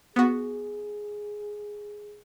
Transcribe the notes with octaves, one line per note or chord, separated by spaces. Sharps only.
B3 F#4 G#4